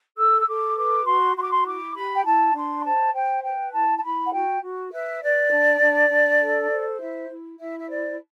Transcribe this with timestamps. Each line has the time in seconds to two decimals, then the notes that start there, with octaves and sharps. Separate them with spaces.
0.16 A4 E6
0.41 E6
0.46 A4 D6
0.75 B4 D6
1.05 F#4 C6
1.35 F#4 C6
1.43 D6
1.51 C6
1.65 E4 D6
1.94 G4 B5
2.13 G5
2.24 E4 A5
2.54 D4 C6
2.84 C5 A5
3.13 C5 G5
3.43 B4 G5
3.72 E4 A5
3.98 A5
4.03 E4 B5
4.25 F#5
4.32 F#4 G5
4.61 F#4
4.91 B4 E5
5.21 B4 D5
5.50 D4
5.81 D4
6.10 D4
6.40 A4
6.70 C5
6.99 E4 E5
7.29 E4
7.59 E4 E5
7.79 E5
7.88 C5 D5